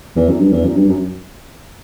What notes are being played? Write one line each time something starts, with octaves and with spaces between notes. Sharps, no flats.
E2
F#2
G2
E2
F#2
G2
F#2